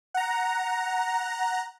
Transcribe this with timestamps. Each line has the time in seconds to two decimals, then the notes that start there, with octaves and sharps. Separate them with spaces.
0.14 F#5 A#5